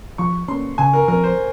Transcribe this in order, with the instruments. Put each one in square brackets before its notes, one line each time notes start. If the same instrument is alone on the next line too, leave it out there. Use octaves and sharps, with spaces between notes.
[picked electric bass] F3 [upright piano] C#6
[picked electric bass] A#3 C#4 [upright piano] C6
[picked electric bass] C#3 [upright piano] G#5
[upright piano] A#4
[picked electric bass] F3 C4 [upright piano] A#4
[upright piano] C5